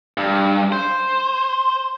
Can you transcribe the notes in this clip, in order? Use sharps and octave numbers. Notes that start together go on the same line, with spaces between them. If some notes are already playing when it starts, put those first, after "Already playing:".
G2
C5